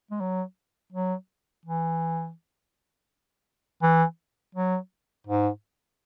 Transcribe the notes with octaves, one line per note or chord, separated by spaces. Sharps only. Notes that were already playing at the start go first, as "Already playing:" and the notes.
G#3
F#3
F#3
E3
E3
F#3
G#2